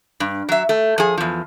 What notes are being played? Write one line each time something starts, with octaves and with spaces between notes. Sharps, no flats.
G2
F#3 E5
A3
F3 G#4
E2 F3